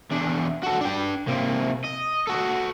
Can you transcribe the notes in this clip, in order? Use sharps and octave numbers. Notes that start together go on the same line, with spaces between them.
E2 D4
F#4 A4
D4 G5
C3 A#3
D#5
F#4 A4